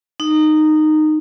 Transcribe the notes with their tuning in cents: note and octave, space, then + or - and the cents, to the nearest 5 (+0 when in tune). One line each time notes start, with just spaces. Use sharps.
D#4 -15